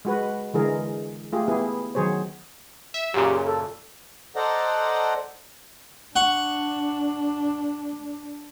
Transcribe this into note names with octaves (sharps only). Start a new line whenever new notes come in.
G#3 F#4 B4
D3 E3 G#3 G#4 A#4
A3 F4 G4 G#4
B3 E4 G4 G#4
D#3 F#3 G#4 C5 C#5
E5
F#2 A#2 C#3 G4
A4
A4 C5 D5 D#5 F#5 A#5
D4 F#5 C#6